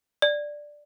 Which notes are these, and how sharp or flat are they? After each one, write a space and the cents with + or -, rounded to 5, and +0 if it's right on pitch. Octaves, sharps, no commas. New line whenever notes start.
D5 +5